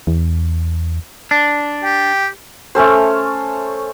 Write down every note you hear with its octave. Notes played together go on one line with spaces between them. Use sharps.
E2
D4
G4 G5
A3 C#4 A4 C5